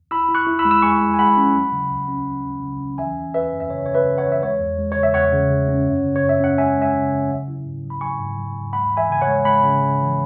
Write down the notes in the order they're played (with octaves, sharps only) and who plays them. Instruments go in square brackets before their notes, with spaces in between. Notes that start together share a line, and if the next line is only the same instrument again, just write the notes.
[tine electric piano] E4 B5 E6
E4
C#6 F#6
E4
B5 E6
G#3
E6
G#3 G#5 C#6
G#3
G#5
G#3 F#5 B5
C#4
F#3
C#3
C#2
C#4
C#2
C#2
C#3
C#4
E3 E5 G#5
E3
E3 B4 E5
F#2
E5
C#3 C#5
C#3 C#5
B4 E5
C#3
C#5 F#5
E3
E5
G#3 C#5
E2
G#3
C#3 C#5
E5
E2 C#5 F#5
C#3
C#3
C#4
F#2
C#3
C#5
F#2
E5
C#4 F#5
G#3 E5 G#5
G#3
E5 G#5
C#3
C#3
F#3
E4
G#2
F#3
B5
F#3 G#5 C#6
G#2
F#3
G#2
G#3 F#5 B5
E3
E5 G#5
C#3 G#5
C#5 F#5
G#3
G#3 F#5 B5
C#3
C#3
E3